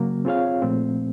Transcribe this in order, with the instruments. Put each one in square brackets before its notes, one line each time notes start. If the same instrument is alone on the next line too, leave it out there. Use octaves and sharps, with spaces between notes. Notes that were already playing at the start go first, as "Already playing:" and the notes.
Already playing: [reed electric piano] C#3 F#3 A#3
C4 F4 G#4 C#5 F5
A#2 F3 A3 C4